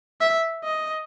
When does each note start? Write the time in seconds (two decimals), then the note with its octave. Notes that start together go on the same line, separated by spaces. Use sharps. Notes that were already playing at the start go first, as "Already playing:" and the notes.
0.21 E5
0.64 D#5